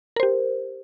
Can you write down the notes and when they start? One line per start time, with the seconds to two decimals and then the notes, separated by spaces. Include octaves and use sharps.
0.16 A#4
0.20 C5
0.23 G4